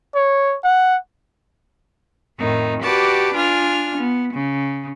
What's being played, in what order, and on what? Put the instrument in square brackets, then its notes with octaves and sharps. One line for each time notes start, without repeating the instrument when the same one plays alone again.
[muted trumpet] C#5
F#5
[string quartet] F2 A2 D#3 D#4
F#4 G4 B4 D5 A5 D6
D4 F4 G#5 F6
B3
C#3